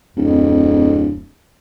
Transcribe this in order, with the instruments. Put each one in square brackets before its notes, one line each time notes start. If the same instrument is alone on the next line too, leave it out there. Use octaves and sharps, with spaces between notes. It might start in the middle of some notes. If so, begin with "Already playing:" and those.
[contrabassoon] D1 [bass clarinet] F2